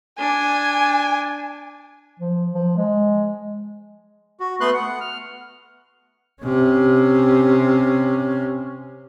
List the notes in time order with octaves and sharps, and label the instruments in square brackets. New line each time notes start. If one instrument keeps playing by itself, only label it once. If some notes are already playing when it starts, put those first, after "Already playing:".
[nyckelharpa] D4 [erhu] G#5
[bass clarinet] F3
F3
G#3
[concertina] F#4
A3 B3 B4 C6 F#6
F#5
F6
[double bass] C3 C#4